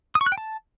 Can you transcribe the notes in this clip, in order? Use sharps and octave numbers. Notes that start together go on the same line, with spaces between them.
D#6
C#6
F#6
G5
A5